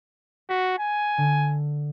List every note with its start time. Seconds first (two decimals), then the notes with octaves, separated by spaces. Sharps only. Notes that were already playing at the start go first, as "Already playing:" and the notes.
0.49 F#4 B6
0.79 G#5
1.18 D3